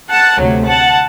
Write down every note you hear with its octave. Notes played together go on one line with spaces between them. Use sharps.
F#5 A5
D2 C3 F#3 A3
F#5 A5